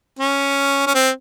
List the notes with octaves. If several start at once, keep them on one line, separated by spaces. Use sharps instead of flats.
C#4
C#4
C4